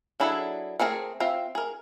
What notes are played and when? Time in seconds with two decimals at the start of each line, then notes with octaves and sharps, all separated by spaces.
0.20 F#3 D4 E4 G#4 A4
0.80 A3 C4 D4 G#4 A#4
1.20 C4 F4 E5
1.55 G#4 A#4